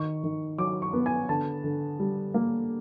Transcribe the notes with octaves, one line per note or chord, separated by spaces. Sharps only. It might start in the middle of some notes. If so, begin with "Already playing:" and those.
Already playing: D#3 C#6
D#3
F#3 D6
C#6
B3
G#5
D3 A5
D3
G3
A#3